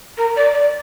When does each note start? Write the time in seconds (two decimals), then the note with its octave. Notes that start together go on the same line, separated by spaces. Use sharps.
0.18 A#4
0.36 D5
0.54 D5